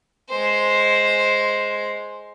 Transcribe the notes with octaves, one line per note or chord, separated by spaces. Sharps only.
G#3 C5